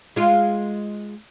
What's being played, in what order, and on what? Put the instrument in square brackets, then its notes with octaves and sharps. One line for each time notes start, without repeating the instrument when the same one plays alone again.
[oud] G#3 F4